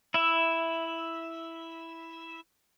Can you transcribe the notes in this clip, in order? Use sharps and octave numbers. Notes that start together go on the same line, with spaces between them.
E4 E5